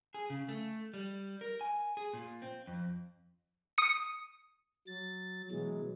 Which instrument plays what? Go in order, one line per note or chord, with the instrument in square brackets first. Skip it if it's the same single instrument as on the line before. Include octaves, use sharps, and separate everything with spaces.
[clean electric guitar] G#4
C#3
A3
G3
A#4
G#5
G#4
A#2
C4
F2
[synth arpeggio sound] D#6 C#7
[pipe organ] F#3 A6
B2 E3 F#3 G#3